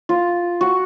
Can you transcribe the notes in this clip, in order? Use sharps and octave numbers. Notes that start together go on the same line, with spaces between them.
F4
F#4